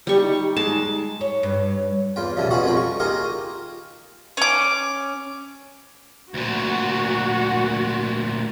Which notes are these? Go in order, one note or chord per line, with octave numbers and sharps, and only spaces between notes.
G3 G4 C#6
D#4
G#3 A5
C#5
G2 C#5
E2 F4 G5
B1 E2 C#3 E3 F3 G3
B3 C#4 D#4 F4 F#4 G#4
C2 F2 F#3 G#3 F4 G5
C#6
D#3 A#3 F4 G4 G#4 A#4
C#4 D6
D2 A#2 F#4